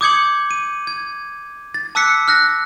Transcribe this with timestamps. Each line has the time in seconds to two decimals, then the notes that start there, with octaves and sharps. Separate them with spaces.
0.01 D6 D#6 G6 G#6 C#7 F#7
0.51 D#7
0.87 G#6
1.74 A6
1.95 A5 D6 E6 F#6 B6 C#7
2.28 F6 F#6 A#6